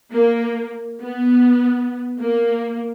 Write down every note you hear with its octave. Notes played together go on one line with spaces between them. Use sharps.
A#3
B3
A#3